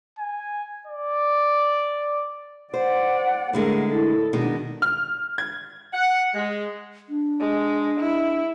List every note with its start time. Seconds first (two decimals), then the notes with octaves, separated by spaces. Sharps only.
0.19 G#5
0.87 D5
2.74 C5 D5 F#5
3.53 A2 D3 G#3 A#3 A#4
3.89 E4 A4
4.33 B2 D#3 G#3 D4
4.82 F6
5.38 G#6
5.92 F#5
6.34 G#3
7.09 D4
7.40 G#3
8.00 E4